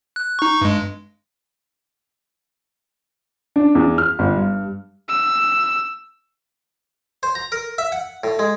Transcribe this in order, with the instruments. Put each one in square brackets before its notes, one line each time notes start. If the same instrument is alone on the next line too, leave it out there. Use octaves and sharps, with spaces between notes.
[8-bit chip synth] F#6
D#4 C#6
G2 G#3
[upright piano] D4
E2
F6
G1
G2
[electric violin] E6
[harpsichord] C5
A#5
A#4
E5
F#5
A2
G#3